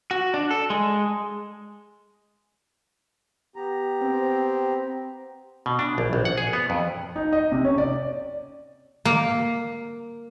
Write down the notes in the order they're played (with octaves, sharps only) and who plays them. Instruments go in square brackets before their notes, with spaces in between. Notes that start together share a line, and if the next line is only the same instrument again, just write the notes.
[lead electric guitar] F#4
D4
A4
G#3
[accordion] B3 G4 A#5
[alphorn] C4
[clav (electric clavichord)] B2
D4
A#1
A#1
F#5
G#4
B3
F2
[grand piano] D#4
D#5
C3
C#4
D5
[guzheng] A#3